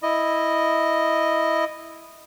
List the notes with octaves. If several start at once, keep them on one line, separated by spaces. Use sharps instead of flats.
E4 D#5